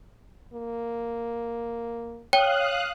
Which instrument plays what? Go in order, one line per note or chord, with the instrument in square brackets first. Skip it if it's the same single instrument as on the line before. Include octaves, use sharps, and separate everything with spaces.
[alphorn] A#3
[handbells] C#5 [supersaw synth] F5 D#6 F#6 [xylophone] G5